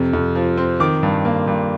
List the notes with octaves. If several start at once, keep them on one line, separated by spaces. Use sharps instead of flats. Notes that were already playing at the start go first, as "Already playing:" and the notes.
Already playing: F2 C3
F2
F3
C4
D#3 D6
G2
A#3
G2